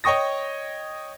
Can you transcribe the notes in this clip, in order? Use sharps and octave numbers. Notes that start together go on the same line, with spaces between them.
C#5 D#5 G5 C#6 D#6 A#6